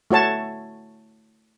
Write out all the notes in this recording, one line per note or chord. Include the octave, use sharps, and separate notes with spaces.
A3 F#4 C#5 A5